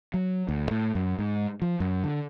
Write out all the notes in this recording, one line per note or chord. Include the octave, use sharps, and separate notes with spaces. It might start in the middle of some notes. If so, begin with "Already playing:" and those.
F#3
D2
A2
F#2
G#2
F3
F#2
D3